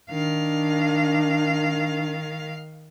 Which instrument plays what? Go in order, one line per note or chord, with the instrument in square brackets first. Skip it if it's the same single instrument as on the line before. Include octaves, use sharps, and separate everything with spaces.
[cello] D#3 F5 [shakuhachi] D4